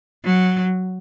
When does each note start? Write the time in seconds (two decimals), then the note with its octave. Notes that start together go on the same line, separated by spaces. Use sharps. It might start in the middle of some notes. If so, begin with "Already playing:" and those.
0.25 F#3